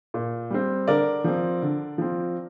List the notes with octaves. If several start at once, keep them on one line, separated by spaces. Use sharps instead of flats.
A#2
G3 C4
D3 A#4 D5
F3 C4
D3
F3 C4